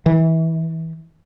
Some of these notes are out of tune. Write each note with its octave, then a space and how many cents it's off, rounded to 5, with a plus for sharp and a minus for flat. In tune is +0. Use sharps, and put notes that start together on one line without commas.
E3 -25